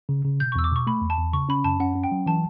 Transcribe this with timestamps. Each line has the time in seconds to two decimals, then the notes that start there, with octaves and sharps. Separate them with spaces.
0.09 C#3
0.25 C#3
0.40 B2 G6
0.52 C#6
0.56 E2 E6
0.64 D6
0.72 B2 C#6
0.87 A3 B5
1.02 E2
1.10 A5
1.18 E2
1.33 C#3 C#6
1.49 C#4 B5
1.64 F#2 A5
1.80 C#4 F#5
1.96 C#4
2.04 G5
2.12 F#3
2.26 E3 A5